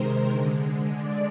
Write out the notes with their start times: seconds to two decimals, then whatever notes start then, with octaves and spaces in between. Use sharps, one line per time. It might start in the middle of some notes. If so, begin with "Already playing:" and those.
Already playing: C3 D#3 G#3 A#4 C5
0.29 D3 G#3
0.95 D5